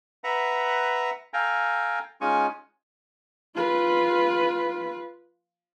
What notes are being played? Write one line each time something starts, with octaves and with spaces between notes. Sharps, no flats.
B4 E5 F#5 A#5
A4 F5 G5 G#5 A#5
G#3 C#4 D#4 F4 G#5 C#6
F4 B4